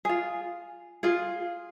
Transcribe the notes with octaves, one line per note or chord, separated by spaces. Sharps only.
F4 G#4
F4 G#4